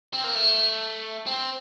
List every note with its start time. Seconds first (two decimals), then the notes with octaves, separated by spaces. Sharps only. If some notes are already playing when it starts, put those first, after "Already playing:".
0.14 C4
0.24 A#3
0.36 A3
1.26 C4